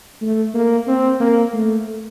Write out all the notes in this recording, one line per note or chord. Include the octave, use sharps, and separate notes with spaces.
A3
A#3
C4
A#3
A3